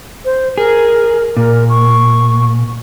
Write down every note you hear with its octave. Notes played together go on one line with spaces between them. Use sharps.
C5
G#4 A#4
A#2 A#4
C#6